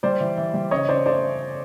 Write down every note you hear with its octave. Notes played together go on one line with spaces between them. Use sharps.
G3 C5 D5
E3
E3
G3
C#3 C#5 D#5
C#3 C5 D5
A3 C5 D5